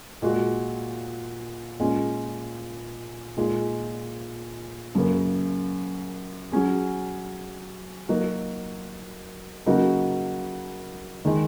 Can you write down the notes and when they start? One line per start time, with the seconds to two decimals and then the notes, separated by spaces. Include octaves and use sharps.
0.22 A#2 G#3 F#4
1.80 A#2 G#3 C#4
3.37 A#2 G#3 D#4 G#4
4.95 F#2 C#3 A#3
6.52 F#3 C#4 G#4
8.08 F#3 A#3 D#4 F#4
9.66 C#3 F#3 A#3 D#4 F#4
11.25 D#3 G#3 D#4